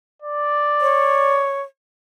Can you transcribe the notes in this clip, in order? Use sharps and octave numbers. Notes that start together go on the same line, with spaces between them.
D5
C#5